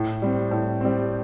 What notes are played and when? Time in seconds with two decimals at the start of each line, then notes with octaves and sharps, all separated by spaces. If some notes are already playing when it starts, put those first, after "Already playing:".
Already playing: A2
0.22 G3 C4
0.51 A2
0.81 G3 C4